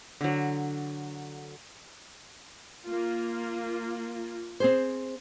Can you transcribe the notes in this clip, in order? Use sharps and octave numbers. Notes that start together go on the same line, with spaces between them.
D3 F#3
A#3 F4
C4 G#4 C5